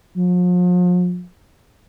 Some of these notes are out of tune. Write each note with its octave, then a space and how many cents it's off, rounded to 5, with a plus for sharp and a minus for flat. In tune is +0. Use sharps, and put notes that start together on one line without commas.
F3 +40